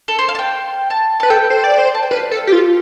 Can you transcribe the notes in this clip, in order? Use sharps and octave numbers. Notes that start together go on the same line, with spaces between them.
A4
C5
F5
A5
G5
A5
B4 A5
A4 G5
C5
D5
C5
A5
G5
B4 F5
A4
G4
F4